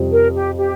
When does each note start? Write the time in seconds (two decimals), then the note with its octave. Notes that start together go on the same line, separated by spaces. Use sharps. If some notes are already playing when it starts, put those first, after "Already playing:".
Already playing: F2 C3 G3
0.12 A#4
0.34 G4
0.58 G4